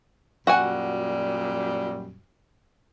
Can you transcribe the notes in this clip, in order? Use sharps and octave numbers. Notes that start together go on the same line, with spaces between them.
F#2 A#2 G3 F#4 F#5 G#5